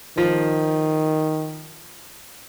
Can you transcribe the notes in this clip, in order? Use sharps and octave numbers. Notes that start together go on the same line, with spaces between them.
D#3 F3